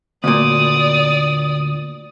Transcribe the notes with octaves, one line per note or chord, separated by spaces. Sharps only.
D2 A#2 D5 D#6